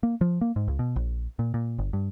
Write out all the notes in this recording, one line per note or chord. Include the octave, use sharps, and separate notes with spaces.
A#3
F3
A#3
G#2
C#2
B2
A#1
A#2
A#2
G1
G2